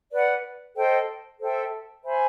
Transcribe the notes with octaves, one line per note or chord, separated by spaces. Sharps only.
B4 D5 F#5
A4 C5 D#5 G5
A4 C5 E5 G5
C5 E5 G#5 B5